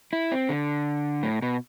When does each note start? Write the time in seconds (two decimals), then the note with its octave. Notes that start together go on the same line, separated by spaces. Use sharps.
0.13 E4
0.32 C4
0.49 D3
1.23 A2
1.42 B2